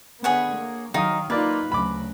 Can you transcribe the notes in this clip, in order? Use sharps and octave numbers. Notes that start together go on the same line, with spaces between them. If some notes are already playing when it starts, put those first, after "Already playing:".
D3 B3 G#4 C#5 F#5
A#3
D#3 F#3 D#4 F5 D#6
A#3 D#4 F4 B4 D5
D2 C#3 F#3 B5 D6